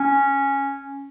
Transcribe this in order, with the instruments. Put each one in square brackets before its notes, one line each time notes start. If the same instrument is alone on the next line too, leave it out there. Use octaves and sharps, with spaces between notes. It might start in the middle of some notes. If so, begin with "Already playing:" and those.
Already playing: [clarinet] C#4